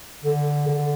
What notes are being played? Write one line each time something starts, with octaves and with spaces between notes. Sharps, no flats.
D3
D3